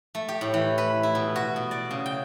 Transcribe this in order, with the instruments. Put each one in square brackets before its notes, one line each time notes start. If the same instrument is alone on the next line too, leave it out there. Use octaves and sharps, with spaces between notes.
[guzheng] A3
G4
A2
E3
B4
E4
B2
F#4
B2
D5
C#3
G5